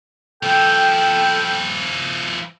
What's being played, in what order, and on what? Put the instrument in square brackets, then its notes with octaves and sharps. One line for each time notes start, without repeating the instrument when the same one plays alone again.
[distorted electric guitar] F3 E4 [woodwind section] A4 G5